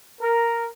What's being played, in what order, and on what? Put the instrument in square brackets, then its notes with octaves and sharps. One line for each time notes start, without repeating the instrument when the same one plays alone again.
[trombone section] A#4